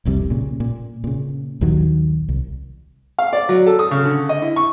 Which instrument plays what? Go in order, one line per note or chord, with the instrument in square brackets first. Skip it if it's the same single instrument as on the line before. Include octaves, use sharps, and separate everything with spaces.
[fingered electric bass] F1 C2 C3 G3
A#2 C#3
A#2
A#2 C#3
A#1 D#2 D#3 F#3
C2
[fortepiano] F5
D5
F#3
A4
D#6
C#3
D3
D#5
E4
C#6